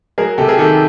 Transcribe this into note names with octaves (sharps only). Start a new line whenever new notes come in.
F#3 G#4 A#4
C3 G4 A4
G#4 A#4
D#3 G4 A4